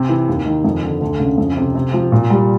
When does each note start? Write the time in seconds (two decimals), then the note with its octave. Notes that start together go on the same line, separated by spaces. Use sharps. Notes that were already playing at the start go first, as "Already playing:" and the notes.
Already playing: C3
0.09 E3
0.28 D#2
0.45 D#3
0.64 F2
0.83 D3
1.01 D2
1.20 C#3
1.38 F2
1.57 C3
1.75 C3
1.93 F3
2.12 A#2
2.30 G3